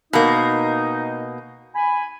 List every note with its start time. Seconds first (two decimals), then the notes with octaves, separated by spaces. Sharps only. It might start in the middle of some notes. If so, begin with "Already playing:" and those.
0.13 B2 A#3 D#4
1.75 G#5 B5